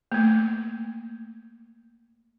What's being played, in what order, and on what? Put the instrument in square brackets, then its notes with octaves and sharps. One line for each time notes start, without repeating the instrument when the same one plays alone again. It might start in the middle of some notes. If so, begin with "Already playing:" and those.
[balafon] A3 A#3